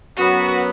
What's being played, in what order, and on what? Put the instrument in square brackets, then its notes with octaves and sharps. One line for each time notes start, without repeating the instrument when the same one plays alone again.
[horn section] F#2 F#3 B3 [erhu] F#4